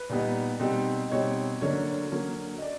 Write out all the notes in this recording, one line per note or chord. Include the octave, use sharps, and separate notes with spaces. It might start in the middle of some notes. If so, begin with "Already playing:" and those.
Already playing: B4
A#2 G3 B3 D#4
B2 G3 C4 D#4
B2 G3 C4 D#4 C#5
D3 F#3 A#3 C#4 C#5
D3 F#3 A#3 C#4
D#5
D5